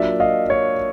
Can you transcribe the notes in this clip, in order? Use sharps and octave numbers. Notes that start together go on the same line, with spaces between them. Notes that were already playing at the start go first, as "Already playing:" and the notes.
Already playing: F#3 A#3 D4 F4 D5 E5
D#5 F5
C#5